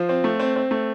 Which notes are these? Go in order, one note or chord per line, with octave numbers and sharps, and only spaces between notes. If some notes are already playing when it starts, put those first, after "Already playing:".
Already playing: F3 C5
C4
A3
C4
C4
A3